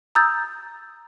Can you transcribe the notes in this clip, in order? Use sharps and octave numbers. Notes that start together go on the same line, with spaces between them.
A#5 D#6 E6 G6 A6